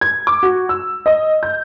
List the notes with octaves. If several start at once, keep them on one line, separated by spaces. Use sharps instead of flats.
G#6
D6
F#4
E6
D#5
G6